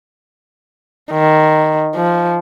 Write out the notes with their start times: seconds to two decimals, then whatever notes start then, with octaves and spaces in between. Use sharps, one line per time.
1.11 D#3
1.95 F3